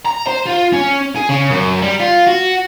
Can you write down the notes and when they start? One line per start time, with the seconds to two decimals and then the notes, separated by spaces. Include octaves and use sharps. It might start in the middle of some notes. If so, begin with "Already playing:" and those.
0.06 A#5
0.27 C5
0.47 F4
0.73 C#4
1.16 G#4
1.29 C#3
1.51 F#2
1.82 G3
2.00 F4
2.27 F#4